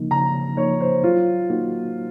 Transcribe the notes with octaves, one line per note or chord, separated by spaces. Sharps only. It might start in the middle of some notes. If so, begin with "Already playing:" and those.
Already playing: C#3 F3 A#3 D#4
C#3 A#5
F3 A#3 D#4 C#5
C5
F#3 F4
A#3 D#4 F#4